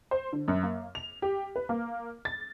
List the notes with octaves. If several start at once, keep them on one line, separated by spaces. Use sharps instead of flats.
C5
D3
F#2
A#3
F7
G4
B4
A#3
A6